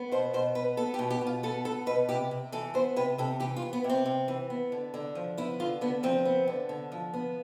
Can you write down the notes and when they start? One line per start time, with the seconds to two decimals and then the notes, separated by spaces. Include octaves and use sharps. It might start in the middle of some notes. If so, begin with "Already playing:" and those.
Already playing: B3
0.11 B2 C5
0.33 B2 C5
0.55 B3 B4
0.77 B3 A4
0.94 G4
0.99 B2
1.10 G4
1.21 B2
1.27 F4
1.43 B3 A4
1.65 B3 A4
1.86 B2 B4
2.09 C3 G4
2.31 C3
2.52 E3 A4
2.74 B3 C5
2.96 C3 B4
3.18 C3 A4
3.40 E3 G4
3.56 F4
3.62 B3
3.73 B3
3.84 C3
3.89 C4
4.06 C3
4.28 E3
4.50 B3
4.72 D3
4.94 D3
5.15 F3
5.38 B3 E4
5.60 D3 F4
5.81 D3 B3
6.03 F3 C4
6.25 B3
6.47 D3
6.69 D3
6.92 F3
7.14 B3